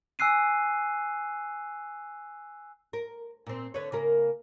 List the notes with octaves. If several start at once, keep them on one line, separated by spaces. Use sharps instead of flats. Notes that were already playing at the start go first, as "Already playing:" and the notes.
G#5 E6 F#6 C7 D#7
A#4
A#2 C4
D3 B4 C#5
C#3 A#3 A#4